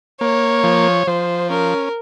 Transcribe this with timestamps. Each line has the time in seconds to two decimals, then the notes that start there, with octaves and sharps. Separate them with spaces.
0.21 A#3 C#5
0.64 F3
1.07 F3 C5
1.50 C#4 A#4